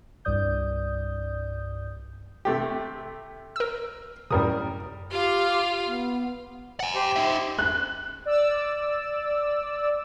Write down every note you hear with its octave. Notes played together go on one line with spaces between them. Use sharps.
C2 G2 D5 D#6 G6
C3 A3 G4
A#4 E6
F#2 A2 C3 G3 A#4 D#6
F4 G4 F5
B3
F#5 G#5
G4 C5
D#4 E5
F#6
D5 E6